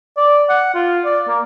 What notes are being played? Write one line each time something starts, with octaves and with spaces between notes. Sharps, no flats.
D5
F#5
F4
D5
A#3